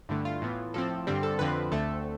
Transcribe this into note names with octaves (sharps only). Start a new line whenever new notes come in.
G2 D3 A3 E4
F4
A2 E3 B3
A2 F3 C4 A4
G2 D3 G3 C4
A4
F2 D3 F3 C4 B4
D2 D3 A3 C4 A4